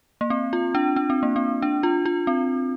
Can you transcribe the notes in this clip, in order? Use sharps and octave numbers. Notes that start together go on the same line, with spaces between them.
A#3
C4
F4
D4
D4
C4
A#3
C4
D4
F4
F4
C4